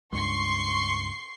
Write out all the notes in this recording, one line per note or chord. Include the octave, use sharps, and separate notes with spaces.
C#2 G2 C6 C#6 C7